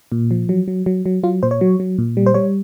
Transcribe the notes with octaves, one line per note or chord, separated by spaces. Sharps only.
A#2
F3
F#3
F#3
F#3
F#3
F#3 F4
A#2 C5
C#5
F#3
F#3
A#2
G3
C5
G3 C#5